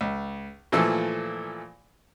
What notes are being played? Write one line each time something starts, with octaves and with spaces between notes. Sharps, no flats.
C#2
A#2 E3 F3 A3 A4